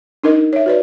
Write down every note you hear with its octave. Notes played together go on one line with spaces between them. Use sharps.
D4 D#4 A#4 D#5
C#5 E5
F#4 B4 D5